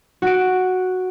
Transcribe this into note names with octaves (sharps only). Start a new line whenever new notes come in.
F#4 D7